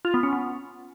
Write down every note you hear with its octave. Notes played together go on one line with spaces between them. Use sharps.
F4
B3
C#4
B3